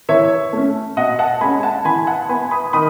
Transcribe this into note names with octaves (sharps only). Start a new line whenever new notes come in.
E3 C#5 E5
A3 C#4
B2 D#5 F#5
F#5 A5
G#3 C#4 G#5 B5
F#5 A5
E3 G#5 B5
F#5 A5
B3 G#5 B5
B5 D#6
D#3 B5 D#6